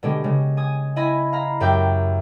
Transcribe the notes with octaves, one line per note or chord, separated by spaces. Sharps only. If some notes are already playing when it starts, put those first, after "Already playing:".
B2 D3 G#3 G4
C#3 G#3
G#5 D#6
E4 D#5 G#5 B5
F5 A#5 B5
F#2 G4 E5 G5 G6